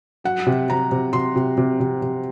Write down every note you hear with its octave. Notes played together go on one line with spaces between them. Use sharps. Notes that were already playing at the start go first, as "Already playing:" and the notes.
F#3 F#5
C3
C3 A#5
C3
C3 C6
C3
C3
C3
C3